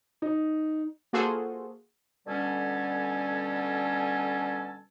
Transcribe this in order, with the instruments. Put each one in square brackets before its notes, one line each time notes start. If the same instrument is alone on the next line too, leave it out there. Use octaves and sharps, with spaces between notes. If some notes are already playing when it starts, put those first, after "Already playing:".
[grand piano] D#4
[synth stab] A#3 F4 F#4 G#4 A4 C5
[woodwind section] B2 D3 G3 C#4 A4 G#5